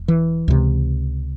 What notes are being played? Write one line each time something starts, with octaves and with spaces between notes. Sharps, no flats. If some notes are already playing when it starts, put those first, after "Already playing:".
Already playing: E1
E3
C#2 C3